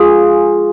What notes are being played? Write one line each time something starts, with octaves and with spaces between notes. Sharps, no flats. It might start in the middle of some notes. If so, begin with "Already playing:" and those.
Already playing: F4 G#4